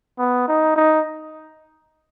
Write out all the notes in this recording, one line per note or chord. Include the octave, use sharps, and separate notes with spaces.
B3
D#4
D#4